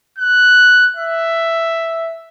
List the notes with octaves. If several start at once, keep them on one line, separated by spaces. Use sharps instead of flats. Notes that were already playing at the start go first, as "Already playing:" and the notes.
F#6
E5